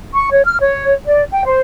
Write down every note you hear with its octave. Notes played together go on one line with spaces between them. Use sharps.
C#6
C#5
F6
C#5
D5
G5
C5